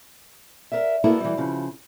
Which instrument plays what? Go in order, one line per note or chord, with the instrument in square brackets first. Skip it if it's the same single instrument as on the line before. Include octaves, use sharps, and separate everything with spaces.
[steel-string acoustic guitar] A#4 D5 E5
[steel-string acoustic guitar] A#3 B3 A4 [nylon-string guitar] E4 F#4
[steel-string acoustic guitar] E3 G3
C#3 F3